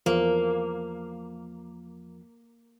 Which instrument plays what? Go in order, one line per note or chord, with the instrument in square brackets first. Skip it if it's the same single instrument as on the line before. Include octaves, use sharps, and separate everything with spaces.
[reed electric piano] E2 F3 [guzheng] A#3